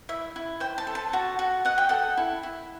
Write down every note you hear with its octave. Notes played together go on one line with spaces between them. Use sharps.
E4 E5
E4
C5 G5
A5
A4
A5
F#4 A5
F#4
D#5 F#5
G5
A4 F#5
E4
E4